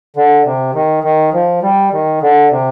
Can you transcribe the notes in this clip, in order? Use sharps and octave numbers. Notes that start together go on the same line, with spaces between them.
D3
C3
D#3
D#3
F3
G3
D#3
D3
C3